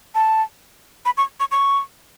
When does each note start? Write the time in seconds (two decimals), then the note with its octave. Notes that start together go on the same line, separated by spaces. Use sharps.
0.15 A5
1.06 B5
1.17 C#6
1.40 C#6
1.51 C#6